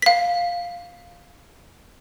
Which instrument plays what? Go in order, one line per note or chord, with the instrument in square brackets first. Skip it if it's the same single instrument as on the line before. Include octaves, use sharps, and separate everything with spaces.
[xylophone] F5 B6